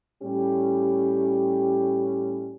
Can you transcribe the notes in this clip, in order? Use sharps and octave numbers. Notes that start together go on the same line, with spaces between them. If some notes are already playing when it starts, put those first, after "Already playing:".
A2 G3 C#4 G4